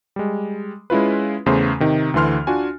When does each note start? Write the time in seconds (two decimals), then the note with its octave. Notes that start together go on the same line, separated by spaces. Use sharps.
0.16 G3 G#3
0.90 G#3 C#4 E4 F4 B4
1.46 E2 C#3 A3 C5 C6
1.80 C3 D#3 D#4
2.14 D2 D3 E3 C6 F6
2.47 D4 F4 F#4 G#5